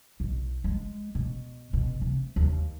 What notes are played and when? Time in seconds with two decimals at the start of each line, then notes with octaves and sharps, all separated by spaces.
0.20 B1
0.64 G#3
1.15 B2
1.73 B2
2.02 C3
2.36 D#2